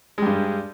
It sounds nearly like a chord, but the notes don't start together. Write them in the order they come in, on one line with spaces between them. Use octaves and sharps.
G#3 G3 G2